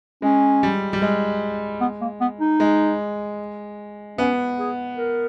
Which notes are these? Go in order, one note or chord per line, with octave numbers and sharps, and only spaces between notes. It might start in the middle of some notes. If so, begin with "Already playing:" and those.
G#3 C#4
G3
G3
G#3
B3
A#3
B3
D#4
G#3
B3 C#4
G#4
A#4